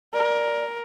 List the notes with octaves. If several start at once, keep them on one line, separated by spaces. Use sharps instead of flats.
A#4 D5